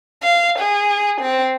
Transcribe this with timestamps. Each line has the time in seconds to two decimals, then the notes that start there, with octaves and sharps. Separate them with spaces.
0.23 F5
0.59 G#4
1.21 C4